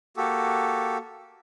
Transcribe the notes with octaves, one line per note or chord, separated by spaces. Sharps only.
A#3 F#4 G4 A4